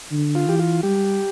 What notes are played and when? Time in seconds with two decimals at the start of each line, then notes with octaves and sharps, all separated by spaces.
0.12 D3
0.35 F4
0.47 E3 G4
0.59 F4
0.83 G3 G4